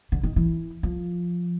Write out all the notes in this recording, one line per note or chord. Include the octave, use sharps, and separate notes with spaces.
D3
D#3
E3
F3